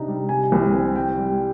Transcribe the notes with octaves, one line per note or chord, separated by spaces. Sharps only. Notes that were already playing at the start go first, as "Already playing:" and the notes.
Already playing: C3 D4 D#4
G3
C3 G#5
C2
C4
G3 G5
G3